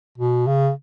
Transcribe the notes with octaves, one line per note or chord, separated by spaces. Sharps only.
B2
C#3